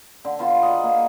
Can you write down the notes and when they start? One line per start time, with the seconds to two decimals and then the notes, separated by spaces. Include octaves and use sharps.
0.25 D3
0.39 D3 B3 F4 A5
0.62 G#4 A#4 D#5 F#5
0.84 A#3